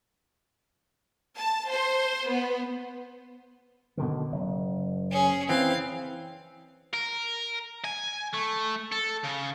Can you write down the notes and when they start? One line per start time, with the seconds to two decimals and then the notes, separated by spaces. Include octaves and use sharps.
1.36 A5
1.69 C5
2.28 B3
3.97 B2 D3 D#3
4.32 F#1
5.11 C#4 G#4
5.49 E3 C4 F5
6.93 A#4
7.85 G#5
8.34 A3
8.92 A4
9.23 C#3